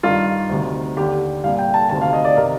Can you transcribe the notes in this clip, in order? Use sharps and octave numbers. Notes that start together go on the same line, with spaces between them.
G2 D#3 F4
D2 C3 D#3
D#2 D3 G4
C2 A#2 F5
G5
A5
D2 C3 D#3 A5
F5
D#5
D5
C3 D#3 A#4